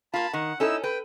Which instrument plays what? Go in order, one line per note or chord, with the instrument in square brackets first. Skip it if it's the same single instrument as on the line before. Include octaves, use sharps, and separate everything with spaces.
[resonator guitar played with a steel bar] A#3 F4 [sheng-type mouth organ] A5 B5
[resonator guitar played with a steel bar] D#3 [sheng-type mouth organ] F#5
[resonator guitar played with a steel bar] C#4 A4 [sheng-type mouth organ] D#4 E4 E6
[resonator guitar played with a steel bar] B4 [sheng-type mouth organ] G5